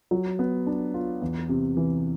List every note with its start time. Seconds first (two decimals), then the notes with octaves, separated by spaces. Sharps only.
0.11 F#3
0.39 B3
0.66 D4
0.94 F4
1.22 E2
1.49 C3
1.77 E3